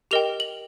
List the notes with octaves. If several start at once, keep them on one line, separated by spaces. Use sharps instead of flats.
G4 A#4 D#5 G5 F7
F#7